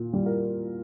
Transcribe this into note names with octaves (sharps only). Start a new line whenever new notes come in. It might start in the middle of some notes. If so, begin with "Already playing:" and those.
Already playing: A#2
G3
A#4